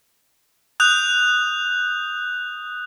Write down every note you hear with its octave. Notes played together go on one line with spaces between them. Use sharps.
D#6 F#6 G6 F7